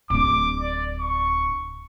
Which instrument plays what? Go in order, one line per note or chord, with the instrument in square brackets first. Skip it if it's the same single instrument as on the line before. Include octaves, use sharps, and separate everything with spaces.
[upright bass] D1 D4 [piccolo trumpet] D6
[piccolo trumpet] D5
C#6